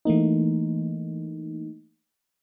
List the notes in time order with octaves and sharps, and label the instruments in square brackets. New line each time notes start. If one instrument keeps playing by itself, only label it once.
[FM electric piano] E3 A3 A#3 D#4